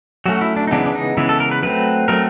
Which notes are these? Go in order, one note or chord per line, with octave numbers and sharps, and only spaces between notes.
F#3 A3 C#4 F#4
E4
D4
D#4
C#3 E3 G#3 B3 D4
D4
D#4
C#3 E3 G#3 B3 E4
A4
A#4
B4
F#3 A3 C4 B4
F#3 A3 C4 A#4